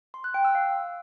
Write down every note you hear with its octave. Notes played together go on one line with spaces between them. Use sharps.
C6
F#6
G5
E6
F5